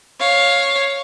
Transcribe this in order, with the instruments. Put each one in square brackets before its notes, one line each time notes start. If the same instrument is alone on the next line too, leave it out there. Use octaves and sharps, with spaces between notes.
[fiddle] C#5 F5